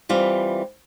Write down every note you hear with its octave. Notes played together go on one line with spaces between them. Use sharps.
E3 G3 C4 F4